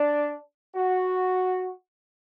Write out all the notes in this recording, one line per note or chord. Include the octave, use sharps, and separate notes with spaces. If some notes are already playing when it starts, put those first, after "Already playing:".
Already playing: D4
F#4